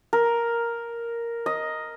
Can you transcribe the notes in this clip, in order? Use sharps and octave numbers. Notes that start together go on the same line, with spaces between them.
A#4
D#5